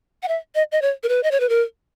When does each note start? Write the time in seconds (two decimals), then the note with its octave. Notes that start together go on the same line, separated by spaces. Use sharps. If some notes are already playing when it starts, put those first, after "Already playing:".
0.23 F#5
0.28 E5
0.55 D#5
0.72 D#5
0.82 C#5
1.03 A#4
1.09 B4
1.23 D#5
1.31 C#5
1.40 B4
1.49 A#4